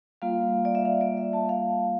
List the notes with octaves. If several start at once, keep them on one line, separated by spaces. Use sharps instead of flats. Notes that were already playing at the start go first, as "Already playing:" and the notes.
G3 A#3 F4 F5
D5
E5
F5
D5
E5
A5
F5